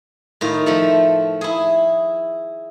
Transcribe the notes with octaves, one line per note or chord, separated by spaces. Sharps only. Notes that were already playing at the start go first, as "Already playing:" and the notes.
A2 D#3 F4
F3 A3 A4
E4 G#4